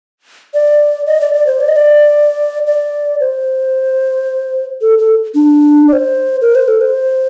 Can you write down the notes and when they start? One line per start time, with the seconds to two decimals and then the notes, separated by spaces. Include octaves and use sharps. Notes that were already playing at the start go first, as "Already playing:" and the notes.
0.54 D5
1.07 D#5
1.21 D5
1.34 D5
1.47 C5
1.61 D5
1.68 D#5
1.76 D5
2.67 D5
3.20 C5
4.81 A4
4.99 A4
5.35 D4
5.88 D5
5.93 C5
6.41 A#4
6.55 C5
6.68 A4
6.81 C5